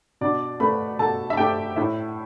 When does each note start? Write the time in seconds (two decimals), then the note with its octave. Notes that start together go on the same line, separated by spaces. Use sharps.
0.21 B2 D4 D5
0.60 A3 B4 B5
0.99 B2 A4 A5
1.30 E5
1.37 A3 G4 G5
1.76 A2 E4 E5